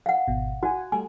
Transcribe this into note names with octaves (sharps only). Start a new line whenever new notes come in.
F5 F#5
G#1 B2
F#4 F#5 G#5
G3 A3 G#5